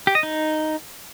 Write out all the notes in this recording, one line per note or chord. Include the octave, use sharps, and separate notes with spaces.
G4
D#5
D#4